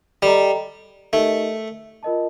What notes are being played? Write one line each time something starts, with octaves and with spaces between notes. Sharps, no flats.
G3 A4 D#5 G5 A#5
A3 D#4 G4 A#4 D#5
F4 A#4 D#5 A5